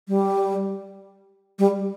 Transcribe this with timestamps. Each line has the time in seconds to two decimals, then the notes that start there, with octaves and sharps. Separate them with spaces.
0.08 G3
1.59 G3